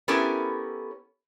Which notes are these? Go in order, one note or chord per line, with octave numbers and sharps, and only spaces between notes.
B3 C#4 E4 G4 A4 A#4